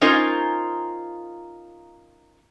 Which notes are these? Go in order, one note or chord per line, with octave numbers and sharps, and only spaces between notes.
C#4 D#4 F4 A#4 C5 G#5